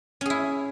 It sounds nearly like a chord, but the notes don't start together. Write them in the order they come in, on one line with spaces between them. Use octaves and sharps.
C#4 G#4 E4